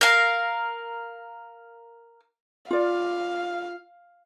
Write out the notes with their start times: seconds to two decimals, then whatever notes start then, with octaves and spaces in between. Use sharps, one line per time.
0.01 A#4 F5
2.71 F4 D5 F5